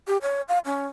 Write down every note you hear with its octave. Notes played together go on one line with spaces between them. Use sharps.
G4
C#5
F5
C#4